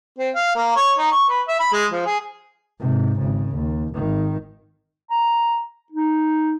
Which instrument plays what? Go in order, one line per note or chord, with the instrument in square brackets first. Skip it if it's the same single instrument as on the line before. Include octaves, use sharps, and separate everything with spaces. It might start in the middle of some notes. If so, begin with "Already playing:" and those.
[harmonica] C4
F5
A#3
C#5
D#4
C#6
B4
E5
B5
G#3
F3
G#4
[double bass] G#2 C3
G#1 C#3
D#2
G#1 D#3
[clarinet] A#5
D#4